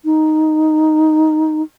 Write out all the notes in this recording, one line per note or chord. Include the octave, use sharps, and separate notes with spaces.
D#4